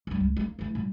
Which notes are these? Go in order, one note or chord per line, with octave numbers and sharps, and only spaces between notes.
G2 G3
C#2
G3 A#3
E3 A3
A#2 G3